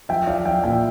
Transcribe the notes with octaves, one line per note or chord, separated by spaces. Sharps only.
F3 E5 G5
F3 D5 F5
F3 E5 G5
A#2 E5 G5